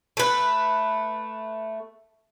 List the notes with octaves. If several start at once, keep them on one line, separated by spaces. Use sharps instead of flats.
A3 B4